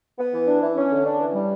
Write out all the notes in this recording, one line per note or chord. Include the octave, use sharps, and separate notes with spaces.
B3
E3
D4
E3
C#4
D3
D4
E3
G3